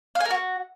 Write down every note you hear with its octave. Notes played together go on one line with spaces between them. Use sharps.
F5
G#5
A#4
F#4